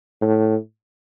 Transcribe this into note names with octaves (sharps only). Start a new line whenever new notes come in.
A2